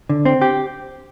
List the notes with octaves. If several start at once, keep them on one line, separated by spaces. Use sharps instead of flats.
D3
C4
G4